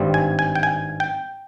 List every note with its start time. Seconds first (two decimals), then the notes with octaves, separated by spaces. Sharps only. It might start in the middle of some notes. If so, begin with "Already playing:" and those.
Already playing: G#1 G2 G3 C4
0.14 G#5
0.39 G#5
0.55 G5
0.63 G#5
1.00 G5